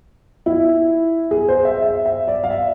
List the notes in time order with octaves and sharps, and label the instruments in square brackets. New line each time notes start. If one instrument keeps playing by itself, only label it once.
[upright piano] E4
G#4
C5
E5
E5
E5
D5
F5
E5